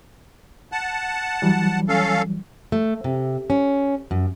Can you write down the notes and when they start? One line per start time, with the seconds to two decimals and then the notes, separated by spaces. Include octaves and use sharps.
0.72 F#5 A5
1.42 E3 F#3 G3
1.88 C#4 A4 F5
2.72 A3
3.04 C3
3.50 C#4
4.11 F#2